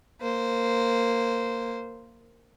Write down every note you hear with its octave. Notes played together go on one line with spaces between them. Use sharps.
A#3 C5